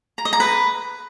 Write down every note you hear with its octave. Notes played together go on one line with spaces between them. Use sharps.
A#5
D#5
A#5
B4